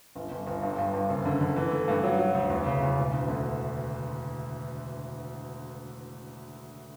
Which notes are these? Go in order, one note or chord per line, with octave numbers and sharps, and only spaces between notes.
G1
G1
G1
G2
G2
G2
F#1
D3
D3
E3
A3
G2
F#3
F#3
D2
E2
C#3
E2
E1
D2
D3